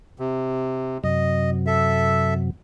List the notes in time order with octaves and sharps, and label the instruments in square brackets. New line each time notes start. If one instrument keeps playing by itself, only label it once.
[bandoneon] C3
[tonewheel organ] F#2 C3 F#3 [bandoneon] D#5
[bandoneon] A4 E5